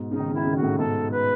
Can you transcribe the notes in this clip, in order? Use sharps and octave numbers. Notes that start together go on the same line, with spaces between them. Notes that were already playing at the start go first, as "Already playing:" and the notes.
Already playing: G#2 B2
C#3 D#4
D#3
C#3
D#3 E4
C#3
D#3 F#4
A2 C#3
G#2 B2 A4
B4